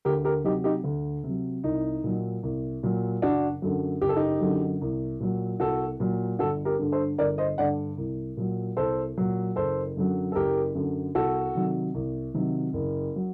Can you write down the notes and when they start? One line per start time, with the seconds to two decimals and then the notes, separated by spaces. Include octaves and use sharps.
0.05 D2 G4 A#4
0.25 G4 A#4
0.44 C3 F#3 D#4 G4
0.64 D#4 G4
0.84 D2
1.24 C3
1.29 F#3
1.63 C2 D#4
2.04 A#2 F#3
2.43 C2
2.83 A#2 F#3
3.22 F#1 D4 F#4
3.62 F#2 D3 F#3
4.02 F#1 G4
4.09 A4
4.16 D#4 G4
4.41 F#2 D3 F#3
4.81 C2
5.20 A#2 F#3
5.60 C2 F#4 A4
6.00 A#2 F#3
6.39 G1 F#4 A4
6.65 G4 A#4
6.79 G2 D3
6.92 A4 C5
7.18 G1 A#4 D5
7.38 C5 D#5
7.58 G2 D3 D5 F#5
7.98 C2
8.37 A#2 F#3
8.77 C2 A4 C5
9.17 A#2 F#3
9.56 F#1 A4 C5
9.97 F#2 D3 F#3
10.32 A4
10.35 F#1 G4 A#4
10.75 F#2 D3 F#3
11.15 C2 F#4 A4
11.55 C3 D#3 F#3
11.94 C2
12.34 C3 D#3 F#3
12.73 F#1
13.16 F#3